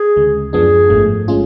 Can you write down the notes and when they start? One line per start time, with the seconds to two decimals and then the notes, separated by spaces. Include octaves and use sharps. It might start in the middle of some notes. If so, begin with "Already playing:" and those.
Already playing: G#4
0.17 D2 C#3 G#3
0.53 F#2 F3 B3 D4 G#4
0.90 A1 G#2 F3 A3
1.28 G#3 C#4 F4